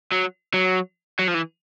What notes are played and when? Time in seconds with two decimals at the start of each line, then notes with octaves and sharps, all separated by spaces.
0.12 F#3
0.54 F#3
1.19 F#3
1.28 F3
1.34 E3